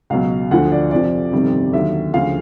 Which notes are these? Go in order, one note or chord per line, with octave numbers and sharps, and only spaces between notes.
C#2 B2 F#3 F5
D2 D3 F3 F#5
D5
F2 C3 F3 D5
G1 F2 C3 D#3 G3
D#2 D3 F#3 E5
D2 C#3 F3 F5